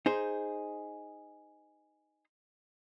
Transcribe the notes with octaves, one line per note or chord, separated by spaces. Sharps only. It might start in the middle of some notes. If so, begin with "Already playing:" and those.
D#4 G#4 C5